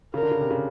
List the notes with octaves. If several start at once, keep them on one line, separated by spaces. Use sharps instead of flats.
C#3 A#4
D3
C#3
C3
C#3